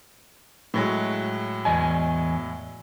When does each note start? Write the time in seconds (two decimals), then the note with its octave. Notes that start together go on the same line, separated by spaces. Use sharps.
0.74 A2 F#3 G#3
1.65 E2 D#5 G#5